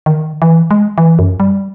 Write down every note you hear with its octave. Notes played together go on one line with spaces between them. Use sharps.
D#3
E3
G#3
E3
F#2
G3